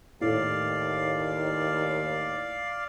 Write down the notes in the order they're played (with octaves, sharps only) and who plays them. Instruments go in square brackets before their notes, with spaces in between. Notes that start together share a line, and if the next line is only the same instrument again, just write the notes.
[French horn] D#2 [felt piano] A2 [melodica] D5 F5